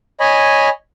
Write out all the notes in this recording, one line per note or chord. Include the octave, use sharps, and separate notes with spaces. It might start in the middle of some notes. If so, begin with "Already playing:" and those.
C#5 D#5 G#5 B5